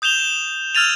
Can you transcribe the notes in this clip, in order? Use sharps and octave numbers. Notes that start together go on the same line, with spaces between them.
D#6 G6 E7 F7 G7
E7
E6 F6 G#6 A6 D#7 F7